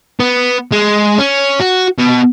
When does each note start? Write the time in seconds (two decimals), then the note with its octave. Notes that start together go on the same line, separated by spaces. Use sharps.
0.20 B3
0.72 G#3
1.18 C#4
1.60 F#4
1.98 B2